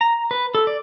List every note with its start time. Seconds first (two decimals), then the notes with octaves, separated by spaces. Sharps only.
0.01 A#5
0.31 B4
0.55 A4
0.67 D5